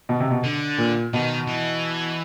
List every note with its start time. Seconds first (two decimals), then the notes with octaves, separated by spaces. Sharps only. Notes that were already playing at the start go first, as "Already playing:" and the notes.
0.09 B2
0.20 C3
0.31 B2
0.44 D3
0.78 A#2
1.13 B2 D#3
1.47 E3